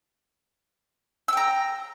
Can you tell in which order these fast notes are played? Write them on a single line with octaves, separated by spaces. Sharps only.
E6 G5 A#5